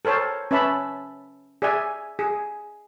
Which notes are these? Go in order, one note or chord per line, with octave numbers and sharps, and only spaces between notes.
A4 A#4 C5 C#5 A5
C#4 B4 E5 A5 B5
G#4 D5 E5 G#5
G#4